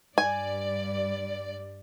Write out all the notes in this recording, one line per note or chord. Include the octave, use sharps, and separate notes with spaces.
G2 D5 G#5